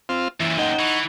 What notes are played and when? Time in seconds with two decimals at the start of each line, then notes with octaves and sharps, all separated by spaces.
0.09 C4 F4
0.40 F#2 A#2 E3
0.58 D#4 D#5 F#5 G5
0.79 E3 C#6